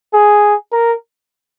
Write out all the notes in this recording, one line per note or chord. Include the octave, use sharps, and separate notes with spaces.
G#4
A#4